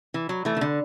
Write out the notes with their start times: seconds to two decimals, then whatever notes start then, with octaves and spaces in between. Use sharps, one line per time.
0.14 E3
0.29 F#3
0.45 E3 A3
0.57 E3
0.61 D3